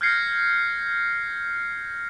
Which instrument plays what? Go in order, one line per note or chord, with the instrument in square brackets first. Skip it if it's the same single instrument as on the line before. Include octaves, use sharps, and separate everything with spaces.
[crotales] F6 G6 G#6 A#6 C7 C#7